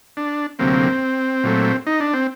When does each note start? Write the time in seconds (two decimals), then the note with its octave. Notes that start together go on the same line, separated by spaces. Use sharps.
0.17 D4
0.59 D2 C3 F#3 A#3 C4
1.44 A#2 F#3 A3
1.87 D#4
2.00 D4
2.13 C4